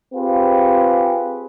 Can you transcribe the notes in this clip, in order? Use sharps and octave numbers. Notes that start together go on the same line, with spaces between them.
C4 F4 G4 G#4 B4